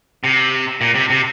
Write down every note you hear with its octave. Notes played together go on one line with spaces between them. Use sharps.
C3
A#2
C3
C3